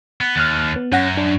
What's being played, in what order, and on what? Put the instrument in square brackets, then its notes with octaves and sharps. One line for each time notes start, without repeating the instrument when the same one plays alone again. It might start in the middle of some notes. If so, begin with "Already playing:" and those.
[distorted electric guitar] B3
[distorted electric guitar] D#2 [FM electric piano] F6 F#6 A6
[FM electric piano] B3
[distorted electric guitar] F#2 [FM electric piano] C#4 F#5 A#6
[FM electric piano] D4